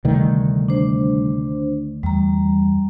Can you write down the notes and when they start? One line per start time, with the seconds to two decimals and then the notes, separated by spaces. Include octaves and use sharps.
0.05 D2 C3 D#3 G3 A3
0.69 D4 C5
2.03 E2 G3 A#5